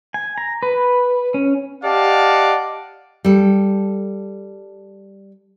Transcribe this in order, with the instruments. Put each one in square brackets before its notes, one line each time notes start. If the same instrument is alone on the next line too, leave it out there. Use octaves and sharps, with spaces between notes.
[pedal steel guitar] G#5
A#5
B4
C#4
[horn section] G4 D5 D#5 F5 F#5 A5
[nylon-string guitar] G3 A4